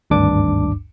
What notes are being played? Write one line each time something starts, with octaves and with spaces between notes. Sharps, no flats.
G#1 D2 G2 D4 D6